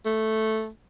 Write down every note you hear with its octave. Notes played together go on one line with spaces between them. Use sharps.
A3